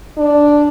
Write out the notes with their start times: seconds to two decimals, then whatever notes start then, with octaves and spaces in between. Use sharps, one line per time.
0.17 D4